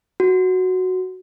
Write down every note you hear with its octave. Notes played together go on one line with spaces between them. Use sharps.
F#4